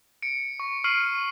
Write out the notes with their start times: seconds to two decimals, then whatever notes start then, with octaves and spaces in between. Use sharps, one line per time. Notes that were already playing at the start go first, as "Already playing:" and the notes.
0.22 C#7 D7
0.60 C#6
0.84 C#6 F6 C7 D7 D#7 F#7